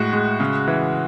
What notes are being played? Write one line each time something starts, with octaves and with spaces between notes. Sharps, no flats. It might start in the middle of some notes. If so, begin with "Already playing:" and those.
Already playing: A2 G#3 F#4
G#3
C#3
E3